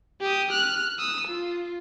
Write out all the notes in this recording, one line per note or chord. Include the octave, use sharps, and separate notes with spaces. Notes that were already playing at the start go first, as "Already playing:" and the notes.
G4 D#6
F6 F#6
D#6 E6
F4